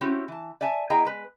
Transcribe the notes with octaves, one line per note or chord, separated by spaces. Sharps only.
C4 C#4 E4 F#4 G4
E3 A5
D5 E5 G#5 A5
B3 E4 G#4 D#5 G5 A#5
G#3 B4